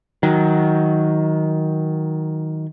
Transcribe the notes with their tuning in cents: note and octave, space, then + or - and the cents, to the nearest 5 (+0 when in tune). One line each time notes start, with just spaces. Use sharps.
D#3 +15 F#3 +0